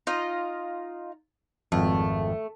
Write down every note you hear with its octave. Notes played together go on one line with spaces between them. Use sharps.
D#4 F4 D#5
G#1 F2 A3